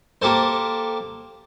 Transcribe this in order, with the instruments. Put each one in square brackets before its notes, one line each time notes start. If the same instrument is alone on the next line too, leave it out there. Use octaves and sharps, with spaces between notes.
[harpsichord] A#3 G4 A4 C5